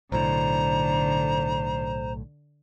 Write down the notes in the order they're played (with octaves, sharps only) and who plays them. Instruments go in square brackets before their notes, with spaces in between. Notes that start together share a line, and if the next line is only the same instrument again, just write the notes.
[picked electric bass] B1 A2 [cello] D3 [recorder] C5 [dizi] A#5